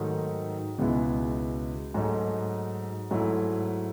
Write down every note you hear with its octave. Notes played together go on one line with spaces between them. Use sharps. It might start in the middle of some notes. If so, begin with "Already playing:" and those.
Already playing: G#2 D#3 F#3 A3 D#4
C#2 B2 G#3 B3 E4
G#2 F#3 A3 D#4
G#2 F#3 A3 E4